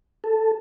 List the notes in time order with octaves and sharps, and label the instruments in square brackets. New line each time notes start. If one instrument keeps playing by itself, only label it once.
[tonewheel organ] A4